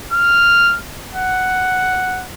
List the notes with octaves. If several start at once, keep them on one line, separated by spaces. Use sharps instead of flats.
F6
F#5